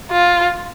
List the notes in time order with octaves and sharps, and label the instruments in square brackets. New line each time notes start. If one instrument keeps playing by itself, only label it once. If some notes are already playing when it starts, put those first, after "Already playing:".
[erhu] F4